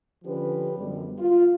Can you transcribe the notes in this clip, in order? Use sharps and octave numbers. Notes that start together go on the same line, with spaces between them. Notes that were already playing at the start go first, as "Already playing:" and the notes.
D3 F3 C#4 G4 B4
F#2 D3 F3 G3 G#3 B3
F4